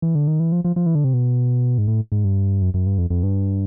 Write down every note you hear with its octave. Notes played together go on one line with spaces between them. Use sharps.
E3
D3
D#3
E3
F3
F3
F3
E3
D3
C3
B2
G#2
A2
G#2
G2
F#2
F#2
G2
F2
F2
G2